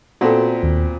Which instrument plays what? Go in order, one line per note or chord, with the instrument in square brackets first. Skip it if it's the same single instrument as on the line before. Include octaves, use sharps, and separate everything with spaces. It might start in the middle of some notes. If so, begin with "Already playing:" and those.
[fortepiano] A#2 B3 C4 [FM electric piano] F#4 A4
[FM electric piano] D#2